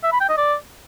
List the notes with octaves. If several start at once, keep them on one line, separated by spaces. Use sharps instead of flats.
E5
B5
G5
D#5
D5